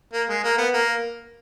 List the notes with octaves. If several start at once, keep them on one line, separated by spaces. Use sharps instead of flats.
A#3
G#3
A#3
B3
A#3